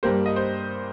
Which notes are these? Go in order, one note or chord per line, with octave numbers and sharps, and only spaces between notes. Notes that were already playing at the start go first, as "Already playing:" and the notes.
G2 G3 A#3 C5
D#5
C5